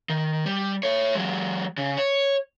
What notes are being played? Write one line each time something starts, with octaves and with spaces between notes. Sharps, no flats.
D#3
G3
A4 C#5
F#3 G#3
C#3
C#5